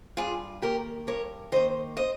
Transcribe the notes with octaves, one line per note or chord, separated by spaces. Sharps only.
G2 F4 G#4
D#3 A#3 G4 A#4
G2 A#4 C#5
D#3 A#3 C5 D#5
C5 D#5